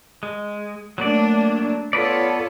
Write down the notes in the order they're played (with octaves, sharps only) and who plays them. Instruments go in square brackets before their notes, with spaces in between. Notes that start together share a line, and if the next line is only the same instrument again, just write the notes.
[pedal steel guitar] G#3
[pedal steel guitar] F#3 A#3 D5 [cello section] A3 D4
[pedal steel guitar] B3 B4 D5 [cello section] F4 A4 C#5